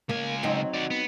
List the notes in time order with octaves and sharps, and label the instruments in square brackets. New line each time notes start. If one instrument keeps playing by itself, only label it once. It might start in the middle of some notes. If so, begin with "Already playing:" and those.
[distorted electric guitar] C#2 G#5 [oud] A#3
[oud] F#3 C4 D#4
[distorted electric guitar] F#4 D5
B3